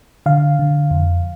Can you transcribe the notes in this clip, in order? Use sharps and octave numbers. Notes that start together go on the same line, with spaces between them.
D3 F5
D3
F2